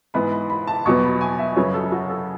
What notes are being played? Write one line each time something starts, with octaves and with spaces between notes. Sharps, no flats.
G#2 E3 B3 B5
B5
B5
A5
E2 B2 F#3 B3 C#6
B5
G#5
E5
F#2 C#3 F#3 B3 C#5
A4
F#4
A4